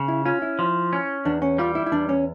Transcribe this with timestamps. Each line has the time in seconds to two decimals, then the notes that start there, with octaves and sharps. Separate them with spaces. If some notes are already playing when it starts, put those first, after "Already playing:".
Already playing: C#3
0.08 E4
0.26 C#4 F4
0.42 E4
0.59 F3
0.93 C#4
1.25 E2 D4
1.42 C#4
1.58 G3 F4
1.75 E4
1.86 E4
1.92 E2 D4
2.09 C#4